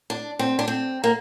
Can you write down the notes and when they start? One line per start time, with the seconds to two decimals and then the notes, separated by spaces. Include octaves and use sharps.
0.10 D4
0.39 C4
0.59 D4
0.68 C4
1.04 A#3